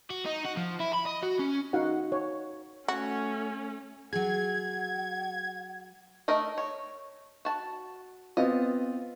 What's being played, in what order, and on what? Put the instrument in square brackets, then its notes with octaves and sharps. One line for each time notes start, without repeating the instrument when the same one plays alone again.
[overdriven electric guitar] F#4
D#4
F#4
F3
E4
B5
D#5
F#4
C#4
[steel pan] D#4 F#4 F5 F#5
C#5
[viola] A3 C#4 [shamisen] F#4
[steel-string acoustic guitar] F#3 G#4 [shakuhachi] F#5 [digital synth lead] G#6
[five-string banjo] A3 A#4 D#5
C#5
F#4 A5
[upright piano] B3 C4 F4 [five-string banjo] D#5